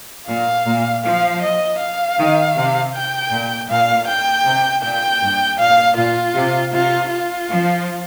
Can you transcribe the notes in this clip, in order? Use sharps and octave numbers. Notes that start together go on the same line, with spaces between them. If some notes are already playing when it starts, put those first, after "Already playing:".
A#2 F5
A#2
F3 F5
D#5
F5
D#3
C3
G5
A#2
A#2 F5
G5
C3
A#2 G5
G2
A#2 F5
A#2 F4
C3
C3 F4
F4
F3